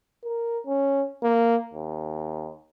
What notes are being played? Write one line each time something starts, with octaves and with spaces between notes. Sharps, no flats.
A#4
C#4
A#3
D#2